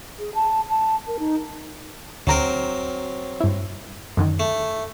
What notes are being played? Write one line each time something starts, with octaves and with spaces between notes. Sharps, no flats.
G#4
A5
A5
A#4
D#4
D2 F#3 C4 A#4 A#5
G2 E4
F#2 D3 D#3
A3